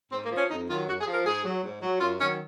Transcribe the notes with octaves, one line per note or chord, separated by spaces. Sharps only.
G#2 C4
A#3
F3
C#4
F2 D#4
D#3 F#3 F4
F#2 F#4
G#4
F3
A#4
G#2 G#4
F#3
G#2
F#3
F#2 F4
D#3 F#3 C#4